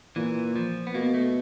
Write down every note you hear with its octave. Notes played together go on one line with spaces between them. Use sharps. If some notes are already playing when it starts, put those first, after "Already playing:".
A#2 E3
F3
B3
B2 A#3
A3